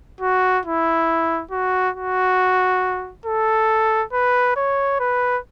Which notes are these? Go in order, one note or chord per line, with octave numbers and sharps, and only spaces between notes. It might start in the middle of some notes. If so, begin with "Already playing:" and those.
F#4
E4
F#4
F#4
A4
B4
C#5
B4